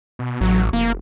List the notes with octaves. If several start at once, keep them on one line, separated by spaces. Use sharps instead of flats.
B2
A1 F#3
F1 A#3